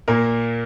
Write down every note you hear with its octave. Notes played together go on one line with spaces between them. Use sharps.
A#2 A#3 A#4